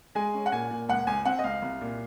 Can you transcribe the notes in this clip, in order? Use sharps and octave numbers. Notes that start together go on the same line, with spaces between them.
G#3 G#5
C#4
F#5
A#2 G#5
A#2
C#2 F#5
C#2 G#5
C4 F#5
D#5
C#2 F5
C2
A#2